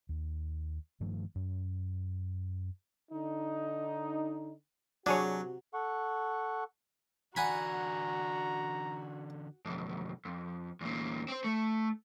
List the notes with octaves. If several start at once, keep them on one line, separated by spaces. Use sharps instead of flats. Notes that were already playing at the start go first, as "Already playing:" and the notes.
D#2
G2 D#3 F3 A3
F#2
D3 D#4
C3 F#3 D4 F#4 G#4 C#5
A4 F#5 C#6
D3 E3 F#4 D5 F#5 G#5 A#5 B5
B1 F2
F2
E2 A#2
C4 C5
A3